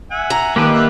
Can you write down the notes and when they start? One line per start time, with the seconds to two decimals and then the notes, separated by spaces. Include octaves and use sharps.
0.11 E5 F#5 G#5
0.30 A#5
0.56 D3 D#3 F3 A#3 D4 G4 B4 F#6
0.74 G3 E5